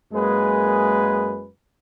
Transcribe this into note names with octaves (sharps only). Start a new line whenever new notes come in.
F#2 G#3 A#3 G#4 B4